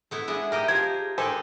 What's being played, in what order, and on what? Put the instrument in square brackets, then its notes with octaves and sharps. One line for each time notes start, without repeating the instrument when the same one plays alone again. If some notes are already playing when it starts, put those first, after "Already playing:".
[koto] A3 B3 E4
[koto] G#3 B3 D4 [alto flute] E5
[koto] D#4 G4 D#5 [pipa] A#4
[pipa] F3 [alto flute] G4 [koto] A#4 C5 [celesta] G#6
[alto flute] G#4
[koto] D4 D#4 A4 [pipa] G4 C5 G#5 [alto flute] A#4